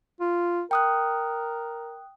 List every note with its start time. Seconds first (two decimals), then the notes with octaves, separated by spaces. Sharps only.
0.20 F4
0.71 A#4 G5 D#6 F#6